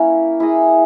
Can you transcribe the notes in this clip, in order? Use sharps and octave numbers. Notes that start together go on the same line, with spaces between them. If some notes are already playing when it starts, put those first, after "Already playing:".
Already playing: A#3 C#4 E4 A#4
E4 G#4 D#5